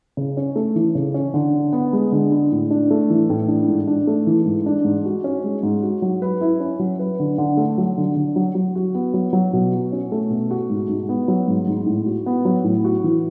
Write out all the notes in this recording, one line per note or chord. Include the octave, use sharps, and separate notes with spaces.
C#3
C#4
A3
E3
C#3
C#4
D3
D4
B3
G#3
D3
D4
A2
D4
A3
E3
A2
D4
G#2
D4
A3
E3
G#2
D4
G#2
F#4
C#4
G#3
G#2
F#4
F#3
B4
E4
C#4
F#3
B4
D3
D3
A3
F#3
D3
D3
F#3
F#3
F#4
B3
F#3
F#3
B2
F#4
C#4
A3
B2
F#4
G#2
G#2
B3
F#3
G#2
G#2
A2
F#4
B3
F#3
A2
F#4
E3